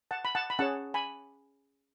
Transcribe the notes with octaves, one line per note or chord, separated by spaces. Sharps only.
F#5 A5
B5
F#5 A5
B5
C#4 G#4 C#5 F#5 A5
G#5 B5